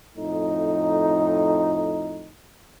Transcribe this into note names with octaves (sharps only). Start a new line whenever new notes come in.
F2 A2 D#4